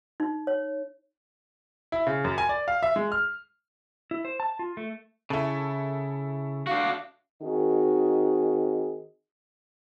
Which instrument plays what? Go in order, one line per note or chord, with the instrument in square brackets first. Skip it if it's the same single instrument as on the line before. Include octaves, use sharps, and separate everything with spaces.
[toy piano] D#4
C#5
[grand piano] E4
C#3
F#2
G#5
D5
F5
E5
G#3
F6
[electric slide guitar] E4
C5
A5
F4
A3
[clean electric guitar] C#3 [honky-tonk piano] E4 A4
[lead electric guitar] D4 F#4 [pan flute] F5
[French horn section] D#3 C4 D#4 F#4 G#4 D#5